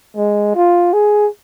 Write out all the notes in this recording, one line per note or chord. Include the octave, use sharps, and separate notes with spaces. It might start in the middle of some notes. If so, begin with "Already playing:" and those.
G#3
F4
G#4